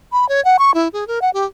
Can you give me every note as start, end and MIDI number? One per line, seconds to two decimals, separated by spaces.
0.12 0.28 83
0.29 0.43 73
0.45 0.57 78
0.59 0.74 85
0.74 0.88 64
0.93 1.07 68
1.08 1.19 70
1.22 1.30 78
1.34 1.46 67